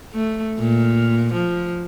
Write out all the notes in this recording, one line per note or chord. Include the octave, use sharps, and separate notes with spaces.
A3
A#2
F3